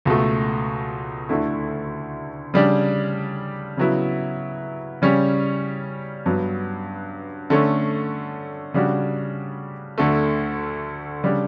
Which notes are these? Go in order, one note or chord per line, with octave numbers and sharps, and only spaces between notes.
C#2 B2 A3
D2 D3 A3 E4
C#3 G3 D4
C#3 F#3 B3 E4
C#3 G3 C#4
G2 F#3 B3
D3 A3 C#4
C#3 G3 D4 F#4
D2 D3 A3
C#3 G3 D4